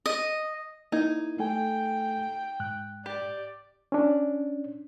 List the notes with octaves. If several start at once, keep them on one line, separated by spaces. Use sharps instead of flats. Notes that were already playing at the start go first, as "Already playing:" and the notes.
D#5
A#3 D#4 E4 G#6
A3 A4 G5 G#5
G#2 F#6
G4 D5
C#4 D4